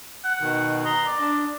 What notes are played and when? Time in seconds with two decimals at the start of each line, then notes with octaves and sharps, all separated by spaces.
0.24 F#5
0.40 B2 D#3
0.85 A#5 C6 D#6
1.06 D5
1.21 D4